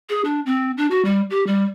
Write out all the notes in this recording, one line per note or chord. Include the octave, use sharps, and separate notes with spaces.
G#4
D4
C4
D4
F#4
G3
G4
G3